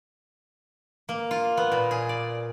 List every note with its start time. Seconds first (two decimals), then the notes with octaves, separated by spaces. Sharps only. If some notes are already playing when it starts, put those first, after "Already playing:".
1.09 A#3
1.31 F4
1.57 B3
1.72 A#2
1.91 G#4
2.09 D5